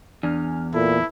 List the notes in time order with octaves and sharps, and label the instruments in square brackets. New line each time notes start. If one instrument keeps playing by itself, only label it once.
[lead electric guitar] E2 [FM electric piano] D4 G#5 F6
[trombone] A#2 [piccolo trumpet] E4 [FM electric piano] A4 B4